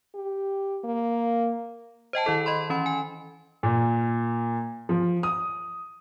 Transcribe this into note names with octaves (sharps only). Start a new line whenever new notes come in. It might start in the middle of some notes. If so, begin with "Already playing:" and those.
G4
A#3
C5 D#5 G5 A5
D#3 E4 A4 D#5
D#5 B5 C6
E3 C#4 B5
G#5
A#2
F3
D#6